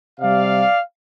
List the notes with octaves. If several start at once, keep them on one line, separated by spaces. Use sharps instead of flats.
C3 G3 D5 F5